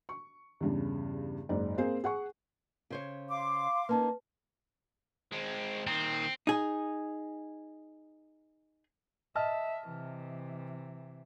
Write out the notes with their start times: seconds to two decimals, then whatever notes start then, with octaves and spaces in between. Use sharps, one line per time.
0.09 C#6
0.60 E2 G2 C#3
1.49 F#1 G#2 D5
1.78 A#3 C4 G#4 C5
2.04 G#4 F#5 C#6
2.90 C#3 C5 C#5
3.30 F5 C6 D6
3.89 A#3 C#4 D#4 B4 A5
5.33 G#3 C4
5.87 A#2 D#3 C4
6.47 D#4 G#4
9.35 D#5 E5 A5 F6
9.88 C3 E3